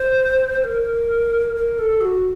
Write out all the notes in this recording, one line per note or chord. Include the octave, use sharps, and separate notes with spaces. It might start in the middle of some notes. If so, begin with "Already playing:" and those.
Already playing: C5
A#4
A#4
A4
F#4